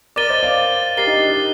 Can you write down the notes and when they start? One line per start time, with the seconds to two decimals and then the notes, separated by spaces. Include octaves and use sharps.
0.16 A#4 D5 D6 A6 D#7 G7
0.29 C5 D#5
0.43 D5 F5
0.97 G4 A#4 A6 C7 G7
1.07 D#4
1.17 D4
1.28 D#4